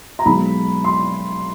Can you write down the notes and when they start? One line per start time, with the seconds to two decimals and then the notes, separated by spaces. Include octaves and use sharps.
0.19 A#5
0.26 B1 B2 G#3 B5
0.84 C6